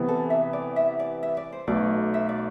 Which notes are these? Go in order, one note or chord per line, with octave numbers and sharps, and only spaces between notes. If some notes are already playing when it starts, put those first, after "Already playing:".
Already playing: C3 E3 B3
A4
E5
D5
E5
D5
E5
D5
C5
B1 B2 A3 D5
E5
D5